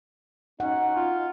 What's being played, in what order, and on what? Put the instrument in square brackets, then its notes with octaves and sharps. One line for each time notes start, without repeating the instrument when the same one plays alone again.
[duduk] C#4 [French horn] D#4 [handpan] F#5
[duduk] F4